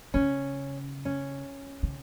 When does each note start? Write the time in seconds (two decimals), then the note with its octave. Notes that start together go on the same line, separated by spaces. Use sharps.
0.14 C#3 C#4
1.05 C#4
1.83 C#3